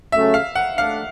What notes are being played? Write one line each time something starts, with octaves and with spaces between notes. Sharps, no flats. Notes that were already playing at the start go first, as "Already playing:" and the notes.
C#3 F#3 A3 C#4 E5
F5
F#5
A3 D4 F5